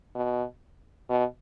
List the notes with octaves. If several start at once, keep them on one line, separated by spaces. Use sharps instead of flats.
B2
B2